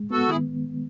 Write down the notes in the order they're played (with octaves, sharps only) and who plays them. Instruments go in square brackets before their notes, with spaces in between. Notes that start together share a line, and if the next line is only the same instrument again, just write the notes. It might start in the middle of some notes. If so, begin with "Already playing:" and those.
Already playing: [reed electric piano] G#3
[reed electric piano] B3 [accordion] F#4 A4
[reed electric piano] D#3 [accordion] E4 G#4